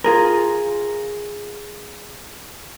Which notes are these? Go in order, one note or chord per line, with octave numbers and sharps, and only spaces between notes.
F4 G#4 A#4